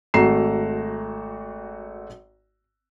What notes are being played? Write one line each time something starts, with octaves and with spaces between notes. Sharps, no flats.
G#1 A3 F#4 A#5 C7 E7